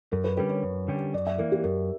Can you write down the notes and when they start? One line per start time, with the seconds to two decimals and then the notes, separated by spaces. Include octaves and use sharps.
0.12 F#2 A#4
0.24 B4
0.37 D3 G3 C#4 G4 B4
0.50 C#5
0.63 F#2
0.88 D3 G3 C#4 G4
1.14 F#2 D5
1.27 E5
1.38 E3 A#3 A#4
1.52 G4
1.64 F#2 A#4